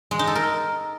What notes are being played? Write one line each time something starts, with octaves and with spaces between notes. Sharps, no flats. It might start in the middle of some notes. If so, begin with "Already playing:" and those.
G#3
D#4
A4
A#4